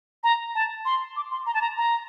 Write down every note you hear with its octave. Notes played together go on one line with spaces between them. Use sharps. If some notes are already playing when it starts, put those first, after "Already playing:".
A#5
A5
C6
D6
C6
A#5
A5
A#5
A#5